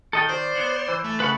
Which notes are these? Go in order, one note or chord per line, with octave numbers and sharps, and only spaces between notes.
D#3 A4 D#5 G5
C5 D5
B3 C#5 F#5
E3
A3
C#3 B4 F#5 B5